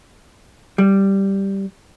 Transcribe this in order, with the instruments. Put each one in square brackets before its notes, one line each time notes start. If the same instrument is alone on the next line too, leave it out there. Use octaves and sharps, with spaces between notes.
[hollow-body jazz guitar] G3